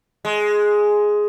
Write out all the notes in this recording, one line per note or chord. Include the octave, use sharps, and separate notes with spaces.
G#3